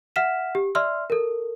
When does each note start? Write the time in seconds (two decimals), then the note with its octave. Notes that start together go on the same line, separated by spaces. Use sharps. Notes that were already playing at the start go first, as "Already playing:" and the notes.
0.16 E5 F#5 F6 B6 E7
0.55 G4
0.75 D5 E5 C6 E6 F6
1.10 A4 A#4